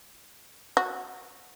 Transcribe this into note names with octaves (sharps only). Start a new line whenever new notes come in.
F#4